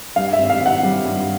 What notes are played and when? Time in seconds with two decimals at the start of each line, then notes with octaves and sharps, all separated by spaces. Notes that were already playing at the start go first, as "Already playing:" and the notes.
0.16 G2 F5
0.33 E5
0.39 G#1
0.50 F5
0.60 G#1
0.66 F#5
0.83 G3
1.05 G2